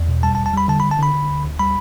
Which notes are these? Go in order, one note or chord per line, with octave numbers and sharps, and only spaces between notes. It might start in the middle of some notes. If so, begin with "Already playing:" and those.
Already playing: E2
B2
G3 A5
A5
E2
A5
G3 B5
D3 A5
B5
D3
A5
D3 B5
D3
D2
D2
G3 B5